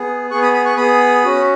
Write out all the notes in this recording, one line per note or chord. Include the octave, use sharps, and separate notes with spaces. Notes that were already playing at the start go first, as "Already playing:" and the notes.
Already playing: B3 G#4
B3 G#4 C#6 F#6
B5 D#6
B5 D#6
C#6 F#6
B3 G#4 B5 D#6
C#4 F#4